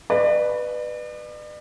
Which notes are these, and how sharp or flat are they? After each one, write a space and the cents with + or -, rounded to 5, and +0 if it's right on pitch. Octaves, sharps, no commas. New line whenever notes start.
B4 +0 D5 +40